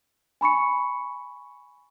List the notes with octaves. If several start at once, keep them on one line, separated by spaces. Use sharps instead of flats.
G#5 B5 C#6 C#7